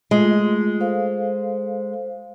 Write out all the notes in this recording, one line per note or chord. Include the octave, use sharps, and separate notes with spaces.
G#3 A3 F4
A4 C5 F5